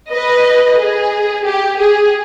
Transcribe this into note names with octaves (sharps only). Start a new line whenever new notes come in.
B4 D#5
G#4
G4
G#4